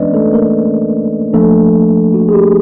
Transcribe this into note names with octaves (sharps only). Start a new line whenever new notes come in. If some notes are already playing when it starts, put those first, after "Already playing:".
Already playing: E3 G#3 B3 C#4 D4 B4 D5 D#5
A3 A4
A#3 A#4
F3 A3 A#3 D4 A4
F#4
G#4
G4